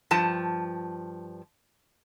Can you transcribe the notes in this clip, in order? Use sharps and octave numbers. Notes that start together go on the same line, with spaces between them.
G2 F3 A5